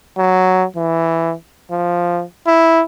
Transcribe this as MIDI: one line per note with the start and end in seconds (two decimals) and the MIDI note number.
0.17 0.64 54
0.76 1.33 52
1.71 2.22 53
2.47 2.82 64